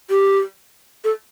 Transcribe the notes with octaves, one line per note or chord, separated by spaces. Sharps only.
G4
A4